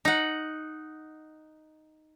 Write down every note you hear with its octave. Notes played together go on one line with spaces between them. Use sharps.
D#4 F#5